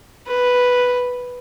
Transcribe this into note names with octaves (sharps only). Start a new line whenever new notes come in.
B4